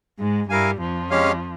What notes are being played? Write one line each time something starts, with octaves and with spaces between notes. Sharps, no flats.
G#2 G#3
G2 G3 E4 A#4 F5 G#5
F2 F3
G#3 C#4 G4 C#5 F5